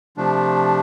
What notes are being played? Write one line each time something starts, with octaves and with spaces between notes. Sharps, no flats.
C3 F3 A3 D4